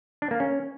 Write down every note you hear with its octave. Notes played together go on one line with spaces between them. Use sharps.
D4
A#3
C#4